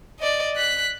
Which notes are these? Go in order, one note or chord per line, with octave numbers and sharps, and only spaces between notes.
D5 D#5
F#6 B6